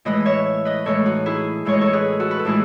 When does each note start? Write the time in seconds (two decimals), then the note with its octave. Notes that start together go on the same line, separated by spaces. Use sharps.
0.05 A2 E3 G#3 B4 D#5
0.25 C#5 E5
0.65 B4 D#5
0.85 A2 E3 G#3 A4 C#5
1.05 D#4 F#4
1.26 E4 G#4
1.65 A2 E3 G#3 C#5
1.74 D#5
1.81 A4 C#5
1.93 G#4 B4
2.20 F#4 A4
2.31 B4
2.39 A4
2.45 A2 E3 G#3 E4 G#4